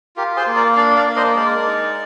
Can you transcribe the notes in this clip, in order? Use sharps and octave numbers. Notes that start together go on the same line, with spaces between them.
F4 G4 A#4
G#4 C5
A#3
A#4 D5
D4 D5 F5
D5 F5
A#3
C5 D#5
G#3 A#4 D5
D#4